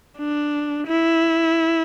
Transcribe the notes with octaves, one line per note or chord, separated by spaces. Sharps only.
D4
E4